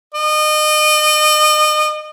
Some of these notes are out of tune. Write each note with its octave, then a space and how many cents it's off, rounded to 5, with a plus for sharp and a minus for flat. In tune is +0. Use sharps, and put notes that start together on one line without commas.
D#5 -35